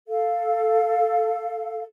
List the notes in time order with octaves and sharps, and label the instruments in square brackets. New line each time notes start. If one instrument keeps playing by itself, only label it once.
[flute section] A4 F5